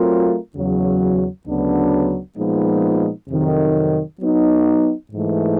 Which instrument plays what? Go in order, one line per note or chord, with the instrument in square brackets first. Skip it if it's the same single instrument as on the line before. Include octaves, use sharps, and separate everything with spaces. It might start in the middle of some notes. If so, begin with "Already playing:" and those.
Already playing: [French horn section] F#3 A3 C4 F4 A#4
E2 C#3 F#3
D2 C#3 F#3 B3 D4
A#2 F3 G#3 B3 D#4
F2 C3 D#3 F#3
F#3 B3 D#4
G#2 E3 A3